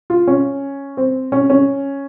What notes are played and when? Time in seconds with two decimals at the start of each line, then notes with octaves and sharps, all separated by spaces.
0.10 F4
0.27 C#4
0.97 C4
1.32 C#4
1.50 C#4